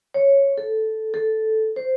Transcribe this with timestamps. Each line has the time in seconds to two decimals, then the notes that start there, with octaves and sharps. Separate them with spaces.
0.14 C#5
0.58 A4
1.14 A4
1.76 C5